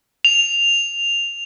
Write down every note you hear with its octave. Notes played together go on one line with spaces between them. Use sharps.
F7